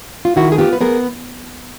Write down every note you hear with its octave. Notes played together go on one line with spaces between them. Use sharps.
F4
D#3 E4 F#4
G#4
B3 F4 G4
B4
B3 G#4 A#4